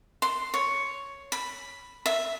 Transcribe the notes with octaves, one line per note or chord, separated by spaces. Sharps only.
C6
C#5
B5
E5